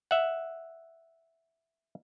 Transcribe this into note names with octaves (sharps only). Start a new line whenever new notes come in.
E5 F#5